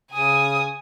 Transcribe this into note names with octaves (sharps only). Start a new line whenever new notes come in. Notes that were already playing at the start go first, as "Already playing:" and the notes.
C#3 G#5 D#6